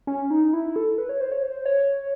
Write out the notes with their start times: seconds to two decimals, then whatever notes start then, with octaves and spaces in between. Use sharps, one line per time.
0.07 C#4
0.31 D#4
0.53 E4
0.76 A4
0.98 B4
1.09 C#5
1.21 C5
1.32 C#5
1.42 C5
1.66 C#5